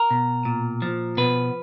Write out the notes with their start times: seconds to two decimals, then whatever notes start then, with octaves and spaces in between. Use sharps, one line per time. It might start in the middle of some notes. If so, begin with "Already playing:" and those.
Already playing: A#4
0.11 B2
0.45 A#2
0.82 F3
1.17 B2 B4